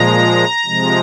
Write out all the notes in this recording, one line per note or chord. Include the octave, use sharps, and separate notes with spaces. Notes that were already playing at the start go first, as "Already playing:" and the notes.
Already playing: A#2 F3 G#3 A#5
C3 F3 G#3